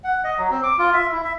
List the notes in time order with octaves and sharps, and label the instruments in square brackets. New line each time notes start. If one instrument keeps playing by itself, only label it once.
[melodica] F#5
D#5
F#3
C4
D6
F4
E5
E4
E5